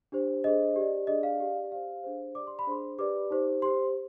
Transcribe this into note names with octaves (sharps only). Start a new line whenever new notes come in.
D4 G4 C5
D4 G#4 C5 D#5
G4 D5
D4 G#4 D5 D#5
F5
G4 D5
G4 C5 F5
D4 G#4 C5
G4 D5 D6
C6
B5
D4 G#4 C5 C6
G4 B4 D5 D6
D#4 G4 C5
G4 C5 C6